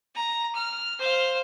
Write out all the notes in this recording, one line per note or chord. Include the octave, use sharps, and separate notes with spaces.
A#5
F6
C5 F5